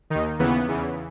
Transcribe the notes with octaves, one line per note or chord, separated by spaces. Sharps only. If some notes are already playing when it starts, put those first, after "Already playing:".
D#2 D#3 D#4
D#2 C#3 E3 B3
E2 C#3 E3